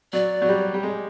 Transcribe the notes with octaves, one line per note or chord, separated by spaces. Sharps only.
F#3 D5
F#3
G3
G3
G#3